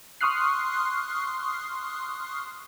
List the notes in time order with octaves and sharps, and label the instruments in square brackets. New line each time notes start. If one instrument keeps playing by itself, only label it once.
[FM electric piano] C6 C#6 D#6 F6 F#6 C7